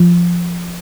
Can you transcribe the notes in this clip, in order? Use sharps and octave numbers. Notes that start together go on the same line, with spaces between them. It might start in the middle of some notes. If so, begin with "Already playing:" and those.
Already playing: F3